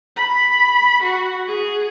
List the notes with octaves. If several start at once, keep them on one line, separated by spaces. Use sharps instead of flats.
B5
F#4
G#4